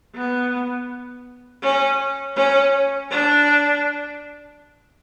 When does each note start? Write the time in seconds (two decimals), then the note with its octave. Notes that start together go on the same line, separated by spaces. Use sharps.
0.15 B3
1.62 C#4
2.36 C#4
3.11 D4